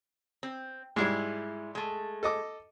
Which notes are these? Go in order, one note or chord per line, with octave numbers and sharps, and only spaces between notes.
C4
G#2 G3 G#3 E4
G#3 A3
A4 D#5 D6